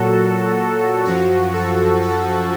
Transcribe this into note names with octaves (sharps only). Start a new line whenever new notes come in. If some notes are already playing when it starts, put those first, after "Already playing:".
Already playing: A#2 F#3 F#4 A4
F#2 F3 F#4
A4
A4